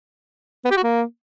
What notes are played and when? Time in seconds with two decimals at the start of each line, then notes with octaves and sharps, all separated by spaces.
0.65 B3
0.71 G4
0.77 F#4
0.83 A#3